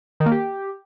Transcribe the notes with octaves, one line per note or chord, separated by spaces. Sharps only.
D#3
A#3
G4